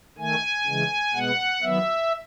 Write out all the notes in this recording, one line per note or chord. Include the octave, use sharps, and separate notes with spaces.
D#3 A3 G#5
C#3 E3 G#3
B2 G#3 B3 F#5
D#3 F#3 B3 E5